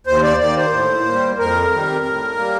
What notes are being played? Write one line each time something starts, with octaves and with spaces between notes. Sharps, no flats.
D#2 C5
D5
D#3 A#3 D5
C5
A2
A#3
G3
F2 A#4
C3 D#3 G3
A2
G3 A#3